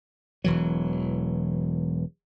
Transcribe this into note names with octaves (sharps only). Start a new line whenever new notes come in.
E1 E3 F#3